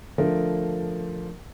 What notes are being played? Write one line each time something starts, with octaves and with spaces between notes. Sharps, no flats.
D3 F3 A3 A#4